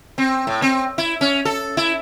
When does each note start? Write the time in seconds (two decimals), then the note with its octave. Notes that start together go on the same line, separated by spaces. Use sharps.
0.18 C4
0.47 A2
0.62 C4
0.98 E4
1.21 C#4
1.45 A4
1.77 E4